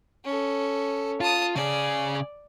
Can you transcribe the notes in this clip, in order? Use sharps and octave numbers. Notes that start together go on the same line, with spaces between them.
C#4 A4
F4 A5 D#6
C#3 G#4 D5